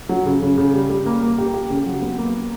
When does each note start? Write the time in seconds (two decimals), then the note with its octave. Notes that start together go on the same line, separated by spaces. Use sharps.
0.09 F#3
0.26 C#3
0.42 C#3
0.57 C#3
0.74 G3
0.90 G3
1.06 A#3
1.22 A#3
1.38 G4
1.54 G4
1.70 C#3
1.86 F#3
2.02 B3
2.18 A#3